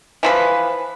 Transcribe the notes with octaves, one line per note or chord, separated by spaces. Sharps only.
E3 F3 B4